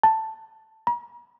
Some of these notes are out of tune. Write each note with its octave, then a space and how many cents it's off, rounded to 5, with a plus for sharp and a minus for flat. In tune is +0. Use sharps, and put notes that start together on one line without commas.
A5 +5
A#5 +45